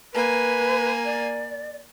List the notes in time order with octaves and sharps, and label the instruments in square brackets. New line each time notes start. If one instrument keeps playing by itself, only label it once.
[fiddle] A#3 G#5 [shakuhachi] B4
[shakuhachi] D5